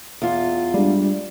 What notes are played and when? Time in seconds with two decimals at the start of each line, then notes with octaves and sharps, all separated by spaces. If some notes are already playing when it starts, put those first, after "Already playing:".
0.22 E2 F4
0.74 G3 G#3 D4